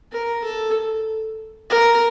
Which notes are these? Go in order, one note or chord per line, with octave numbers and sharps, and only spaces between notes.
A#4
A4
A#4